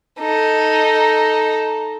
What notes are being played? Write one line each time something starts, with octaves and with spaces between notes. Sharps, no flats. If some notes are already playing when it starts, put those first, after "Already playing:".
D#4 A4